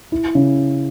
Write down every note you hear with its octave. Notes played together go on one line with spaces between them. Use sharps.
E4
C#3